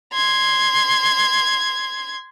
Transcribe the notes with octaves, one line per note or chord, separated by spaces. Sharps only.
C6 G#6